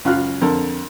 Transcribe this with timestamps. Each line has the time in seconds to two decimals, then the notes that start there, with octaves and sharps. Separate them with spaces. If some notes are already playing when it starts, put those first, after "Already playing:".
0.05 C#2 F#2 F4 F5 F6 F#6
0.41 F2 D3 A4 A#4